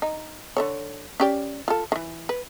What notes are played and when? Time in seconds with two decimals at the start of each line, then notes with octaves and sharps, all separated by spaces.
0.02 D#4
0.57 D3 A4 C#5
1.20 C#4 G4 D5
1.68 F4 A4
1.92 D#3 E3
2.29 B4